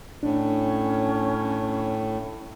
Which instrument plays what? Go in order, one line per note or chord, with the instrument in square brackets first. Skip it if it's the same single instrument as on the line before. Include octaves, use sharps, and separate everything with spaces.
[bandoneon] A2 [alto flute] C#4 [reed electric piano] D4